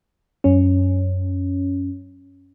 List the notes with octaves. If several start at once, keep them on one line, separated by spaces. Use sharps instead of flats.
F#2 C#4